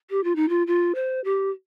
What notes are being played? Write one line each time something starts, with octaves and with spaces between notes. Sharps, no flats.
G4
F4
D#4
F4
F4
C5
G4